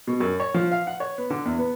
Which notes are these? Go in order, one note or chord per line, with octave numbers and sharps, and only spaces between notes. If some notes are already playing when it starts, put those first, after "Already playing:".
B2
F#2
C#5
F3
F5
F#5
C#5
B3
D3
E2
B3